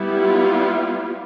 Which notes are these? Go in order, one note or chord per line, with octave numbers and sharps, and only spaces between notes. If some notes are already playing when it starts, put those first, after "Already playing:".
Already playing: G3 B3 E4
F4